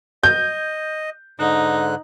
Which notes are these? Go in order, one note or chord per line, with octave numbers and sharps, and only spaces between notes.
D#5 G6
G#2 D3 D#4 F#6